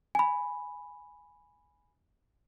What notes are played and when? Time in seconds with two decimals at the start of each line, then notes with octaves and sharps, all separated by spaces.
0.15 G#5 B5